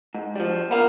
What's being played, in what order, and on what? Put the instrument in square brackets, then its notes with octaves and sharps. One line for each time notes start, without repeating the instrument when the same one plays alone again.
[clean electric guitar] G#2
F3 G3
[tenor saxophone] A#3 [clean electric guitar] B3 F5